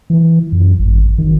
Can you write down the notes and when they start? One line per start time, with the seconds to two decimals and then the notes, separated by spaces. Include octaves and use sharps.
0.10 E3
0.52 F#2
0.79 G#1
1.18 D#3